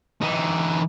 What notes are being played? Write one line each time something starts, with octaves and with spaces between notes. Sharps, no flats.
E3 D#4